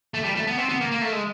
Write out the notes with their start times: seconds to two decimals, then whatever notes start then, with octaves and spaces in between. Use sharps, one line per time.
0.14 A3
0.24 G3
0.36 A3
0.47 B3
0.58 C4
0.69 B3
0.81 A#3
0.91 A#3
1.01 A3
1.12 G#3